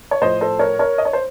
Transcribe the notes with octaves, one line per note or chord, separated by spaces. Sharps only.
C#5
A2 F3 A3 C5 D#5
A4 C5
A#4 C#5
A#4 C#5
D#5
C#5
C5